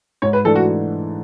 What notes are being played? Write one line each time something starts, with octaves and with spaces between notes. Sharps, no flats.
G#2 C#5
B4
E3 A3 D4 A4
F#4